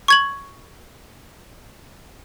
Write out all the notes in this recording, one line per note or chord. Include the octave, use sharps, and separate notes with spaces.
C#6 G#6 F#7